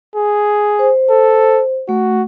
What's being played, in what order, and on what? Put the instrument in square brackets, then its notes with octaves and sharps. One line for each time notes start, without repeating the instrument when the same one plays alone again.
[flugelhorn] G#4
[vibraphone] C5
[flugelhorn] A4
[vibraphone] A3 [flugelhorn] F#4